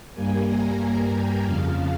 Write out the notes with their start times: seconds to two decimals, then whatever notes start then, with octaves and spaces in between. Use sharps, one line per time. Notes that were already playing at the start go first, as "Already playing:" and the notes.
0.14 G2 G3 A#3 G#5
0.46 A#5
0.78 G#5
1.11 G5
1.44 F2 C#3 F3 F5